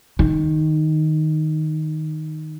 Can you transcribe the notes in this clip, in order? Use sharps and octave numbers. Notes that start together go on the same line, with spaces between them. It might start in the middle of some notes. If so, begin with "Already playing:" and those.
D#3